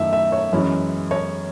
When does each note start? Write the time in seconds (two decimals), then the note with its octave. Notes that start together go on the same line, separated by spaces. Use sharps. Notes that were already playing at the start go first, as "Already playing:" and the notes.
Already playing: F#2 D#3 A3 E4 E5
0.13 E5
0.32 C#5
0.53 F#2 E3 G#3 C#4 E4
1.11 C#5